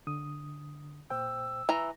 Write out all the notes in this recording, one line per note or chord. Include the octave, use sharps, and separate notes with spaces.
D3 D#6
A#2 C5 G5 E6
E3 A#5